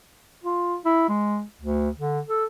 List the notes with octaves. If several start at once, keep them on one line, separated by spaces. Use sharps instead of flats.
F4
E4
G#3
D2
D3
A4